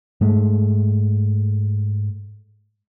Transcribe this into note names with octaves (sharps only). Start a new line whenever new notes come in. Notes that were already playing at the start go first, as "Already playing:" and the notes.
G#2 G#3 A3